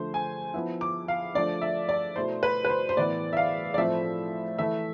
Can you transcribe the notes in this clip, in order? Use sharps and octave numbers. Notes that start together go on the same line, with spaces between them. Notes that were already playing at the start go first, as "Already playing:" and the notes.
Already playing: D3 F3 A3 C5
G#5
F3 B3 E4
D6
F5
F3 A3 D4 D5
E5
D5
B2 A3 E4 C5
B4
B4
C5
C5
A2 E3 B3 E4 D5
E5
F5
D5
A2 F3 A3 C4 E5
E3 A3 E4 E5